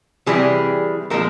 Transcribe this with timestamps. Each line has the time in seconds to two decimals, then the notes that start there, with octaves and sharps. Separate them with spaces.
0.26 C3 E3 G3 G#4
1.10 A#2 F3 G#3 A#4